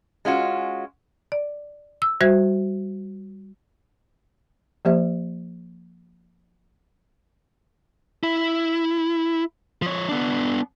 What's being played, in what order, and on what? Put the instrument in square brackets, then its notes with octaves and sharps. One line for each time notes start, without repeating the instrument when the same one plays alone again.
[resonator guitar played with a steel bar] G#3 C#4 F4 F#4
[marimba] D5
E6
G3 F#4 C5 E5 G#6
[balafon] F3 A#3 G4 C5 E5
[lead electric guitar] E4
F3 C#5
B3 D4